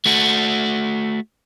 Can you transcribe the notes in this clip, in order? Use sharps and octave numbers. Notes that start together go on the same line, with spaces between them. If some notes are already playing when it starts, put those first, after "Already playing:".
A3 F#4